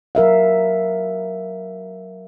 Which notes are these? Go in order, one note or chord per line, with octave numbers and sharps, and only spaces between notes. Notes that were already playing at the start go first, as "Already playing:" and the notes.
F#3 A#4 E5 F5